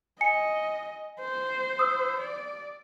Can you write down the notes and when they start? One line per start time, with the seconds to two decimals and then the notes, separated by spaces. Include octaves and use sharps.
0.21 D#5 G#5 C#7
1.20 C5
1.79 D#6 E6
2.20 D5